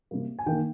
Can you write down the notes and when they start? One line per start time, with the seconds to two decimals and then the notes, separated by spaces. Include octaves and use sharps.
0.11 C3 G3 A#3
0.39 G#5
0.46 D#3 A#3 D#4 G5